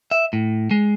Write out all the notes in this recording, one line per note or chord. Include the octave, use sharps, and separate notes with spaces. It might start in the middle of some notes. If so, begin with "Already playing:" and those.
E5
A2
G#3